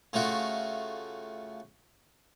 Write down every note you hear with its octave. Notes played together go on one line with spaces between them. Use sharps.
C#3 A3 F4 F#4